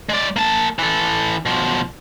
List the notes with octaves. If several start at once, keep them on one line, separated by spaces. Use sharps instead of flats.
G#3 D5
A#3 A5
E3 A4
B2 F3